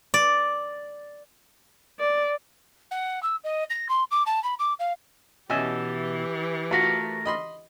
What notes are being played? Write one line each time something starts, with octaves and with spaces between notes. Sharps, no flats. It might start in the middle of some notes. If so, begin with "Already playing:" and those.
D5
D5
F#5
E6
D#5
A#6
C6
D6
A5
B5
D6
F5
B2 E3 C#4 G4 D#5 E5 G#5
A3 F4 F#4 A#4
D#5 B5 C6